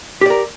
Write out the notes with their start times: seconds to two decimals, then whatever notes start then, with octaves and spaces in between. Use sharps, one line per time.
0.21 G4
0.26 D5
0.30 A#4